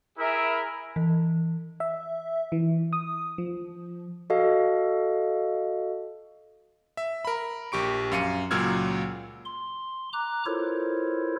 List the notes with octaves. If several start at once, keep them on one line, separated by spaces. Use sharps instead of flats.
E4 G#4 A#4 E5 B5
E3
E5
E3
D#6
F3
F#4 A4 D#5 F5
E5
A#4 B5
A#1 G4 C#6 D7
F#2 F5 C#7 D#7
C#2 A#2 F#3 E6 F6 G#6
C6
A#5 D6 F#6
E4 F4 A4 A#4 C5 C#5